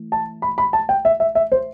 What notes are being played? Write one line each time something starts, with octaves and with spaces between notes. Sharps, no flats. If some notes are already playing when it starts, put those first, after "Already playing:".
Already playing: E3 A3
A5
B5
B5
A5
G5
E5
E5
E5
C5